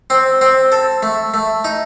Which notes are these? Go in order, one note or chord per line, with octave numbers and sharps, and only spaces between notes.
C4
C4
A4
A3
A3
D#4